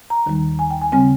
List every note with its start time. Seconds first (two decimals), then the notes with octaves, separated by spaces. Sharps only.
0.10 A#5
0.26 D#2 D#3 G3
0.59 G#5
0.71 G5
0.82 G#5
0.92 C#3 G3 C4 G#5